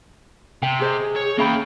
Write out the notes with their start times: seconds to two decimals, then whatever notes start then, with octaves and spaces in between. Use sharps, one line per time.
0.63 C3 G5
0.80 G4 G#4 C5 D#5
1.16 C#5
1.38 A#3 C#4 E5 G5 B5